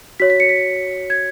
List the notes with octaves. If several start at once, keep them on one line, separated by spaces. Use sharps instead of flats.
F#4 C#5 B6
B6
C#7
B6
G#6